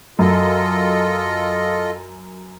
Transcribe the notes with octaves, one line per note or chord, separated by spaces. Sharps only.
F#2 F4 A4 D#5